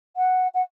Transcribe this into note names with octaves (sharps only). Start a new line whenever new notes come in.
F#5
F#5